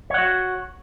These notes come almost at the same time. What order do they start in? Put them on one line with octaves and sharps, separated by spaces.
C#5 F#5 F#4